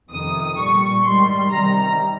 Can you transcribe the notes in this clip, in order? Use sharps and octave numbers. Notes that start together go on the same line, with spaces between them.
F2 C3 D#3 D#6
A#2 G3 C#6
G#2 D#3 G3 C6
C3 D#3 G3 A#5